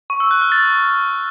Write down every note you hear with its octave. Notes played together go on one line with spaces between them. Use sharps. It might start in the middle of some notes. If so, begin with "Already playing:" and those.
C#6
E6
F#6
F6
A6